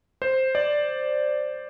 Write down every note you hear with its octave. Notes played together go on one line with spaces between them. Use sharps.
C5
D5